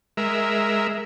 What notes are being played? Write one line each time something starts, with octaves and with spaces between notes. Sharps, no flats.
G#3 A#4 E5